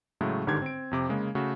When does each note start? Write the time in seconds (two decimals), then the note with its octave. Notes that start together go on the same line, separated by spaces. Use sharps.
0.21 A2 C#3 F#3 G#3 A3
0.47 G1 G#2 D3 D#3 G4 G#6
0.62 C4 D7
0.91 F2 C3 D6
1.09 C#3 G#3 A#3
1.35 C#3 A3 F#4